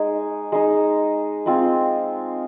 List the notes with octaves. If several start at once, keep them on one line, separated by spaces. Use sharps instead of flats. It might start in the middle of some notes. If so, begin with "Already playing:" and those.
Already playing: G#3 D#4 G#5
G#3 D#4
G#3 C4 F4